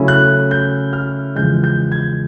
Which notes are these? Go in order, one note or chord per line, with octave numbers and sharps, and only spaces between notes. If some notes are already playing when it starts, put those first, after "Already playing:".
Already playing: C#3 F#3 A3 C#4 E4
F#6
G6
F6
E2 C#3 F3 G#3 G6
G6
G#6